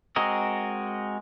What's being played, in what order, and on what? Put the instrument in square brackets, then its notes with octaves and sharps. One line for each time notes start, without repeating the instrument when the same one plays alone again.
[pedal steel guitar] G#3 C4 F#4 A#4 D#5